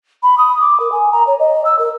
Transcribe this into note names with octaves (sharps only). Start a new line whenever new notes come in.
B5
D#6
D6
A#4
G#5
A#5
C#5
D#5
E6
A#4